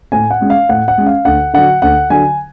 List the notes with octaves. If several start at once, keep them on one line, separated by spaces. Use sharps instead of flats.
A2 G#5
F#5
G#3 C#4
F5
A2 F#5
F#5
G#3 C#4
F5
D2 F#5
D3 F#3 F#5
D2 F#5
D3 F#3 G#5